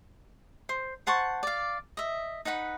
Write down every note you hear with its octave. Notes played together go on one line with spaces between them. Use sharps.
C5
C5 F#5 A5 C#6
D5 F5
D#5 E5
D#4 B4 F#5 B5